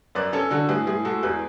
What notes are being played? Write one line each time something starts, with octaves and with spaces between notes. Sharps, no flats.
F#2 B4 D5
C#4 A4 C#5
D3 F#4 A4
A2 G#4 B4
A2 G#4
G#3 F#4 A4
E2 G#4 B4